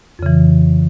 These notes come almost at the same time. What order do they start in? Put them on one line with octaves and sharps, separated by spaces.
F2 C#3 E3